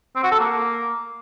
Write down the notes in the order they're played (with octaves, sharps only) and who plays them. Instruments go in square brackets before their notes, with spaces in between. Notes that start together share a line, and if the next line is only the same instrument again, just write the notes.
[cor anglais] C4
F#4
A4
A#3